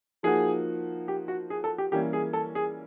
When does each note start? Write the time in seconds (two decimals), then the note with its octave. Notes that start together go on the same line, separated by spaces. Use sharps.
0.23 F3 A#3 D#4 F#4 G#4
1.08 G4
1.28 F#4
1.50 G#4
1.64 A4
1.78 G4
1.92 E3 G3 A#3 C#4 G4
2.13 G#4
2.33 A4
2.55 G#4